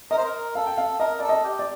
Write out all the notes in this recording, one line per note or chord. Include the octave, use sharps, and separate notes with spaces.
A#4 D#5
C5
A#4
A4 F5
G5
F5
A#4 D#5
A4 D5
D#5
G4
D5